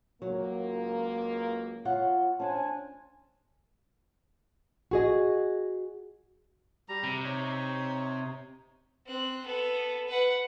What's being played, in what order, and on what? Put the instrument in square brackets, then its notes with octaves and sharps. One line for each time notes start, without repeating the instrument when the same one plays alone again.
[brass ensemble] C#2 A#3 [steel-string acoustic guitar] F#3
[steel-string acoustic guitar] F4 C#5 F#5
[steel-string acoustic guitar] C#4 D4 [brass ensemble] C5 G#5 A5
[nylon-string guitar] F#4 G#4 D#5
[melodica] G3 A#5
[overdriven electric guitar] C3
[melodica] D#4 C#5
[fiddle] C4 F#6
B3 A4
B4 F#5